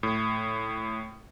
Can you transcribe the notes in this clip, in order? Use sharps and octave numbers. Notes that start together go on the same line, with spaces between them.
A2